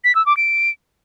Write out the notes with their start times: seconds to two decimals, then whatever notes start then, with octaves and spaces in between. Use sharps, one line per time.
0.04 B6
0.15 E6
0.26 D6
0.37 D7